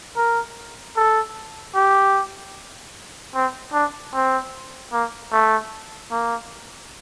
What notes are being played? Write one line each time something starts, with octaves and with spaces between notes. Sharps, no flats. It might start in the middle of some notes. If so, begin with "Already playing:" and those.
A#4
A4
G4
C4
D4
C4
A#3
A3
A#3